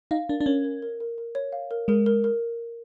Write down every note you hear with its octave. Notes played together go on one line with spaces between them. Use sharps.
D#4 F5
D4 A#4
D4
C#4 A#4
A#4
A#4
A#4
A#4
C#5
F5
A#4
G#3 A#4
A#4
A#4